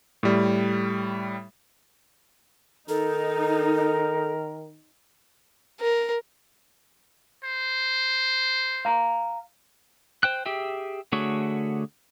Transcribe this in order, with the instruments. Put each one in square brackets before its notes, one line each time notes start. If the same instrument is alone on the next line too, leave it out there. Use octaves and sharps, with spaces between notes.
[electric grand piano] A2 G3
[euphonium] D#3 [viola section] D#4 [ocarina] A4 [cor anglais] A#4
[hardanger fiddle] A#4
[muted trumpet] C5
[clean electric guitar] F5 A#5
[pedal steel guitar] C5 G5 F#6
G4 G#4 E5 G5
D3 A3 F#4 G#4 C#5